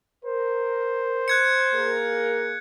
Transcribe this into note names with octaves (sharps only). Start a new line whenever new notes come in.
A#4 C5
F#6 G#6 C#7
A#3 G#4 A#4